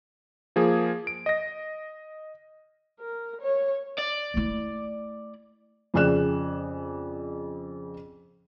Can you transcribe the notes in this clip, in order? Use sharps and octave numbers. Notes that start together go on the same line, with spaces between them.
F3 A#3 G#4
D7
D#5 A#6
A#4
C#5
D5
A3 E4
F2 C#3 G#4 D5 F#6 E7